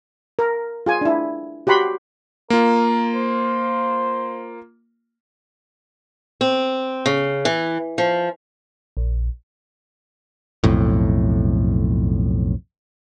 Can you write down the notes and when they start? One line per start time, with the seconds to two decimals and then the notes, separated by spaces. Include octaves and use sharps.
0.39 A#4
0.86 F4 G#4 G#5
1.01 D4 E4
1.67 F#4 G4 F#5 B5 C6
2.50 A#3 F4 A#4
3.15 C5
6.41 C4
7.06 C#3
7.45 E3
7.98 F3
8.97 A#1
10.64 B1 F2 A2